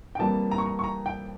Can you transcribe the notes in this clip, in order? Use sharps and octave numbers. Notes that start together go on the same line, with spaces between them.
G5
F2 E3 G3 A#3 A5
A#5
C#6
A#5
C#6
A#5
G5